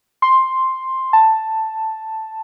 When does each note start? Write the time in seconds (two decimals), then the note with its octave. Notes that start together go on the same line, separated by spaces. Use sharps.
0.22 C6
1.13 A5